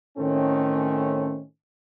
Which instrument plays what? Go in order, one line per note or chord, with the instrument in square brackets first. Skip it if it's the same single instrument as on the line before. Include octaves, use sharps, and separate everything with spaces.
[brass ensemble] A2 D#3 A3 C4 C#4